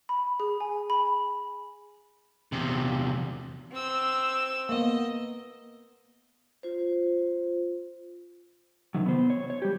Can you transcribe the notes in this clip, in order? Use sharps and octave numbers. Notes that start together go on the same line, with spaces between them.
B5
G#4
G#5
B5
E2 C3
C4 E6
A#3 B3 D#5
F4 C5
C3 D#3 F#3
B3 C5
C#5
C#5
G3 G4